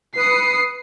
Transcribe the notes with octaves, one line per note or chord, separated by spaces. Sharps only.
B4 D#6 C7 C#7